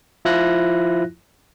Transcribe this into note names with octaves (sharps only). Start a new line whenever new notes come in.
F3 E4 F4 F#6 A#6